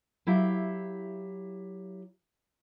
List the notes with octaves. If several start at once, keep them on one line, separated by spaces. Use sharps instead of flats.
F#3 E4 G4 E5 F5